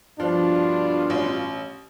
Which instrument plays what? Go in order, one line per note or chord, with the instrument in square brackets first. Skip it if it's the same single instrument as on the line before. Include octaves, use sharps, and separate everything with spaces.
[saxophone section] G2 B2 F4 [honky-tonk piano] F3 [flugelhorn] D4
[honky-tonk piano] A1